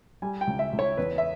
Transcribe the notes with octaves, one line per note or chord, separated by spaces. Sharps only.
G3 G#5
G5
C#2
E5
C#2
C#5
E2 B4
E5